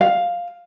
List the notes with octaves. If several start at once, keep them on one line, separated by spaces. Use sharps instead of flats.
F5